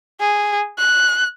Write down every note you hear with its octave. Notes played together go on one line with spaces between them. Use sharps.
G#4
F#6